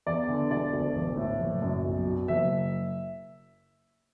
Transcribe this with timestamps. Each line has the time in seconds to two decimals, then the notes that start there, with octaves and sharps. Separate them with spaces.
0.06 E2 D5
0.29 D3
0.51 E1 D5
0.73 D2
0.95 A1
1.17 A2
1.40 F#1
1.62 F#2
1.84 B1
2.06 B2
2.28 F#1 E5